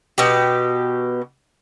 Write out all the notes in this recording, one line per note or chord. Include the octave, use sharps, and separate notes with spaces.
B2 G4